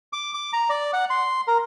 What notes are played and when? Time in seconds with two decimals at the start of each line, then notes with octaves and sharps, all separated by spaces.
0.13 D6
0.34 D6
0.53 A#5
0.69 D5
0.93 F#5
1.10 C6
1.48 A#4